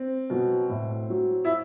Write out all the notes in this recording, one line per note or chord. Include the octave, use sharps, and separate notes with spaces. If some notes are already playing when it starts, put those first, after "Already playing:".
Already playing: C4
B2 F#3
A2
F#3
E4